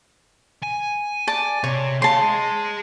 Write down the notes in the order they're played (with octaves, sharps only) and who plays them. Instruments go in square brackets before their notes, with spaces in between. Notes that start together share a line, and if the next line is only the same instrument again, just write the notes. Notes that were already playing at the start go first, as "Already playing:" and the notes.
[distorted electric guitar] G#5
[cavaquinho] D5 A5
[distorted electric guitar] C3 [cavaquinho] C#5
[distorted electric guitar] C#5 F5 [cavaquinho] A5 C6
[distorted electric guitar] G#4 D#5